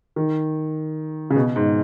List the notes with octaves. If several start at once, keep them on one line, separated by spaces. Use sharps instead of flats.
D#3
C#3
B2
G#2